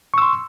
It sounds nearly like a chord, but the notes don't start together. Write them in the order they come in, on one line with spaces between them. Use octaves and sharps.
C#6 E6 C6